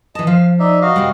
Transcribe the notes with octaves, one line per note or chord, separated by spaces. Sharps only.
E3 D#5 A5
F3 F5
D#4 D5 E5
F#4 D#5 F5
C3 G3